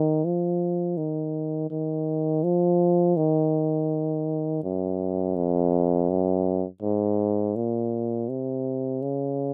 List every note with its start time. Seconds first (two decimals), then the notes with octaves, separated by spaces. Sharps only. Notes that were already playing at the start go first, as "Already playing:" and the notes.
Already playing: D#3
0.25 F3
0.97 D#3
1.70 D#3
2.44 F3
3.17 D#3
4.63 F#2
5.36 F2
6.10 F#2
6.82 G#2
7.56 A#2
8.29 C3
9.02 C#3